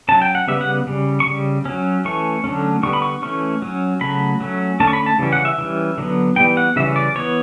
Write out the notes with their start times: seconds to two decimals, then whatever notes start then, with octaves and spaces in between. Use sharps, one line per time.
0.09 F#3 C#4 A5
0.22 G5
0.35 F#5
0.48 C#3 G3 B3 E5
0.61 F#5
0.87 C#3 G3
1.20 C#6
1.27 C#3 G3
1.65 F#3 C#4
2.05 E3 A3 C#4 C#6
2.44 D3 F#3 A3 C#4
2.83 D3 G3 B3 C#6
2.93 B5
3.02 C#6
3.22 E3 A3 C#4 C#6
3.62 F#3 C#4
4.01 C#3 F#3 A3 B5
4.40 F#3 A3 C#4
4.80 D3 A3 C#4 A5
4.87 C#6
4.93 B5
5.06 A5
5.19 C#3 E3 G3 C#4
5.33 F#5
5.45 E5
5.58 E3 G3 C#4
5.98 D3 F#3 B3
6.36 E3 G3 B3 G5
6.57 F#5
6.76 C#3 E3 G3 C#4 E5
6.96 D5
7.15 E3 B3 C#5